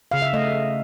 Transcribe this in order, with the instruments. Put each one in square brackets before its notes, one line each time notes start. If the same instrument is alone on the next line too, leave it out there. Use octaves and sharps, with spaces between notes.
[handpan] C#3 F5
E5
A3 D#5